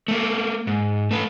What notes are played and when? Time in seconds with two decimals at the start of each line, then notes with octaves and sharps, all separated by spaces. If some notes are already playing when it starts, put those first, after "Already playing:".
0.08 A3 A#3
0.67 G#2
1.11 A3 B4